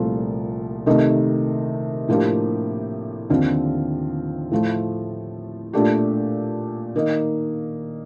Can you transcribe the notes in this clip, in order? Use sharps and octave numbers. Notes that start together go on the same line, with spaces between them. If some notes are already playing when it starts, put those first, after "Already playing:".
Already playing: C2 A#2 F3 A3
C3 D#3 A3 D#4 A#4
A2 F3 A#3 D4 G4
D#2 D3 F3 C4 F4
A2 F3 A3
A#2 A3 D4 G4
D#3 A#3 D#4